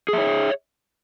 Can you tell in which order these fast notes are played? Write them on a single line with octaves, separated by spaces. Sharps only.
G#4 E5 C#5